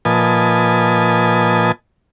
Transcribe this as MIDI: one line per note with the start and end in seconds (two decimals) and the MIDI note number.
0.05 1.72 46
0.05 1.72 53
0.05 1.72 71
0.05 1.72 75
0.05 1.72 80
0.05 1.72 81